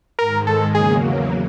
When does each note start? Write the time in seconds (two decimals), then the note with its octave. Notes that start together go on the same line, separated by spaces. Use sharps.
0.19 G#2 D#3 G#3 A#4
0.47 A4
0.74 E2 C#3 F#3 A#3 G#4